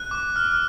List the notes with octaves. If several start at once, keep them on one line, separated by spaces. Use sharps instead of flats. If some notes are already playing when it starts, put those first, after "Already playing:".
Already playing: F#6
D6
F6